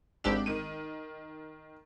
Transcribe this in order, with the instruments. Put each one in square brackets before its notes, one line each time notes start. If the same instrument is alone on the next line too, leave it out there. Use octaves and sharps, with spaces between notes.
[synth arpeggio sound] G#1 G4 E6 [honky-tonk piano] D4
[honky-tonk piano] D#3 D#7